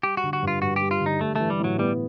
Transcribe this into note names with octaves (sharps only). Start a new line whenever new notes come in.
G3 G4
F#4
D3
F#4
G2
F4
G2 F#4
G3 G4
F4
D3
D#4
G3 A3
E3 A3
G3
A2 F#3
G3 B3